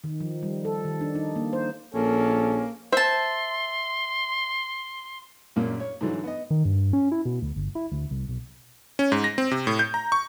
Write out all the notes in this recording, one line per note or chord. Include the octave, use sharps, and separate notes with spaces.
D#3
F3
G3
A4
D#3
D4
D#4
A#3
C5
A#1 A#3 C#4 A4
C5 E5 A5 C6
A#1 F#2 A#2 A#3
C#5
G#2 D3 E3 F#3
B3 D#5
D#3
G2
C#4
E4
B2
D2
G1
E4
D2
C2
B1
C#4
G#2
A#6
C4
C3
A2
G6
A#5
C#6